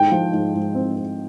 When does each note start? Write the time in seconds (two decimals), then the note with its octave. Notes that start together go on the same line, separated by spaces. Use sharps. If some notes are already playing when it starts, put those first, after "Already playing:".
Already playing: G#2 G5
0.12 F3
0.33 G#2
0.54 G#2
0.75 C4
0.96 C4